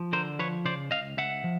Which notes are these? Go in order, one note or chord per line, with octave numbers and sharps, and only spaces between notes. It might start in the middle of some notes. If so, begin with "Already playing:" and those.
Already playing: F3
D3 A#4 C5
F3 B4 C#5
C#3 C5 D5
C#2 D#5 F5
C#2 E5 F#5
F3